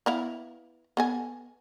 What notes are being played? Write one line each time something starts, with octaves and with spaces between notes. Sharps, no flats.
B3 E4 F5
B3 A4 G#5